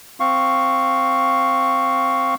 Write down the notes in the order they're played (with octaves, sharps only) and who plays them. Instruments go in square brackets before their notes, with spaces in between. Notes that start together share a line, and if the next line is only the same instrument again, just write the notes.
[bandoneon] C4 F5 C#6